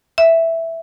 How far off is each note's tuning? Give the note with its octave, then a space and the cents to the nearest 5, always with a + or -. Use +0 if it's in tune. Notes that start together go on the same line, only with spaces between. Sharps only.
E5 +0